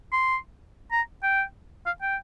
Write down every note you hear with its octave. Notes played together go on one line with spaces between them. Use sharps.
C6
A#5
G5
F5
G5